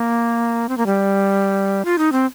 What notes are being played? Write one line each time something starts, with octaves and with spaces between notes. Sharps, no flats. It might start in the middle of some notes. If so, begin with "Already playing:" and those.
Already playing: A#3
C4
A#3
G3
F4
D#4
C4